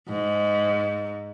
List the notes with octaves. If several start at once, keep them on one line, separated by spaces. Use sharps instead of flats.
G#2